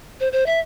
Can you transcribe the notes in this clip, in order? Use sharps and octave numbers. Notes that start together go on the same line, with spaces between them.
C5
C5
E5